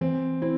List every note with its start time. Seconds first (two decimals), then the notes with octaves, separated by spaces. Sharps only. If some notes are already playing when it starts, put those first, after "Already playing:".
0.01 E3 C4
0.42 C4 E4